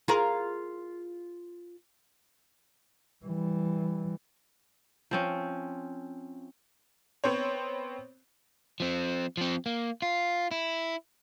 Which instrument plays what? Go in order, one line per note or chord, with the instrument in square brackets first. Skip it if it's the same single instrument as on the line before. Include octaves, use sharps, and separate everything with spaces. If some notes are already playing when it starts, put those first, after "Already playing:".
[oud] F4 G#4 A#4
[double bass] E3 G3
[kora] F3 C4 C#4
[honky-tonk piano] B3 C4 C5 C#5
[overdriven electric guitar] F3 C4
F3 C4
A#3
F4
E4